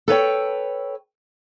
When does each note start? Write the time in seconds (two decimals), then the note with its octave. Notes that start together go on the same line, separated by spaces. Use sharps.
0.08 A4 B4 C#5 G5